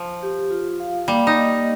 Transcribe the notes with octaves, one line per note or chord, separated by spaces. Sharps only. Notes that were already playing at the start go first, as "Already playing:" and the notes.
Already playing: F3
G4
F4
F5
G3 A#3
D#4
D#5